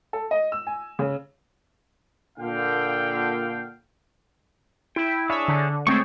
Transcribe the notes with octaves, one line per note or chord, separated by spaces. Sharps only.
A4
D#5
E6
G#5
C#3
A#2 D3 F5 G5
E4 G5
D4 G#4 C#5 E5
D3
G#3 A3 C4 C#5 G5 C#6